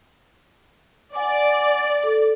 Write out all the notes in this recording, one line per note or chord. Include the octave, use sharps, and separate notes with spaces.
D5 F#5 G#5 D6
A4